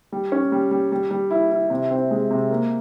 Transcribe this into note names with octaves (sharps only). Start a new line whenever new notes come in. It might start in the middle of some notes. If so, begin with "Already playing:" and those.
G3
C#4
G3
G3
G3
G3
E4
E4
C3
C4
G#3
C3
A#3